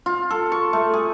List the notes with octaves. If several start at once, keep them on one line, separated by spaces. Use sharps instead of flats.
F4
A4
C#6
A3
G#4